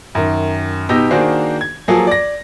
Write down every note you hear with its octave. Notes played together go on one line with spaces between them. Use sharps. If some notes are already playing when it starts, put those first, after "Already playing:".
F#2 D#3
B2 D#4 G4 E6 A#6
D#3 A#3 D4 F#4 G#4 C5
G#6
F3 F#3 A#3 G#4 A4
D5 A#6